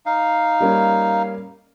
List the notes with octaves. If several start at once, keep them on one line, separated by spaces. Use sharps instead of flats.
D#4 F5
G3 A#3 C#4